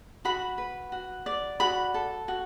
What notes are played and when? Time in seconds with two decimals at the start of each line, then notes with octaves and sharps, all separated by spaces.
0.25 F#4 B5
0.58 B4
0.92 F#4
1.26 D5
1.60 F#4 B5
1.94 A4
2.28 F#4